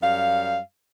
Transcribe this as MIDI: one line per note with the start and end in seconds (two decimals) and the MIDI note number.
0.02 0.59 42
0.02 0.59 55
0.02 0.59 77